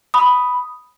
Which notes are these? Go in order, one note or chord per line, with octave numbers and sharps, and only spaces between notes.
B5 D#6